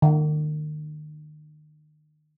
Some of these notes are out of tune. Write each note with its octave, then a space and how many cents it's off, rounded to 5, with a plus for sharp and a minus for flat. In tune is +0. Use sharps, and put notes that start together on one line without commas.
D#3 -40